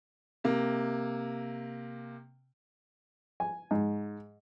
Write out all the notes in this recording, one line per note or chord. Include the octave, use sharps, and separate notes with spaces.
C3 A#3
G#5
G#2